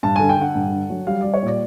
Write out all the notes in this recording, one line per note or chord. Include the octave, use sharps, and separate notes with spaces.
G2 A5
D3 G#5
G5
D3 F#5
G2
D3
F#3
G3 F5
G3 D5
C#5
A#2 D5